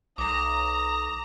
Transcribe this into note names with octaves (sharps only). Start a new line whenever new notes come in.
B1 A#5 D6 D#6 A#6